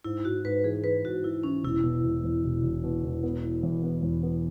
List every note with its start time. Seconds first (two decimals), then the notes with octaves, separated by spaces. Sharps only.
0.04 G#2 E4
0.24 G#2 F#4
0.45 G#2 B4
0.64 E3 G#4
0.84 E3 B4
1.04 G#2 F#4
1.24 E3 E4
1.43 E3 C#4
1.64 E1 E4
1.84 B2
2.04 E1
2.24 E2
2.44 E1
2.63 E1
2.84 B2
3.03 E1
3.23 B3
3.44 E3
3.63 E2
3.83 B3
4.03 E2
4.23 B3